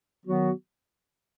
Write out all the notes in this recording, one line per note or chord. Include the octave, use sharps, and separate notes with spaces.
D#3 F#3 B3 F#4